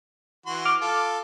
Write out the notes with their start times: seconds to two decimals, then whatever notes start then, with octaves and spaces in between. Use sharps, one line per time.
0.46 E3 F#4 C6
0.65 D6 F6
0.81 F4 A4